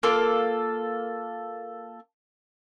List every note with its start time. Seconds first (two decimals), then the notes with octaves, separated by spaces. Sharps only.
0.03 A#3 F4 A4